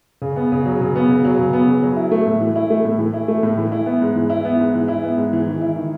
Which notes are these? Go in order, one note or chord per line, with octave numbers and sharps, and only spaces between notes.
C#3
B3
C#3
F#3
C#3
B3
C#3
F#3
C#3
B3
C#3
F#3
E4
A3
A2
E3
E4
A3
A2
E3
E4
A3
A2
E3
E4
B3
G#2
E3
E4
B3
G#2
E3
E4
B3
G#2
E3
D#3
E4
D#3